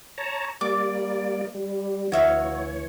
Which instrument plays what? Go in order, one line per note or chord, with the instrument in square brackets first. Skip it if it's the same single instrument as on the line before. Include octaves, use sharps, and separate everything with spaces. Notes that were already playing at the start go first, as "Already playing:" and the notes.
[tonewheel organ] C#5 A5 A#5
[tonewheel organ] G3 A#3 D5 [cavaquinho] D6
[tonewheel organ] G3
[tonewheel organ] D2 E3 C#5 [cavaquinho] F#4 E5 F5